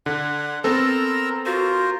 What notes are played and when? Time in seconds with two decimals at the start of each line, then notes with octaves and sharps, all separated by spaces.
0.06 D3 F#5
0.64 B3 C4 A4 A#4 A#5 E6
1.46 F4 F#4 A#4 C5